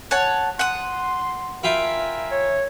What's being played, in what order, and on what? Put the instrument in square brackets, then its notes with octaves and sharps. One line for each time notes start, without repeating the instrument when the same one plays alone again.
[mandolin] C#5 F#5 A5
[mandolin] F#5 D#6 [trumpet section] C6
[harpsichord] E4 F4 G5 [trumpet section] A#4 E5 G#5
[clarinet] C#5